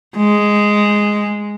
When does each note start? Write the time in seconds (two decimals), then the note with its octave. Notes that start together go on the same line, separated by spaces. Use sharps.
0.17 G#3